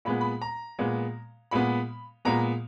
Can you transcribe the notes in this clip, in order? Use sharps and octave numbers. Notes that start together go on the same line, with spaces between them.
A#2 G#3 B3 B5
B5
A#5
A#2 G#3 B3
A#2 G#3 B3 B5
A#2 G#3 B3 A#5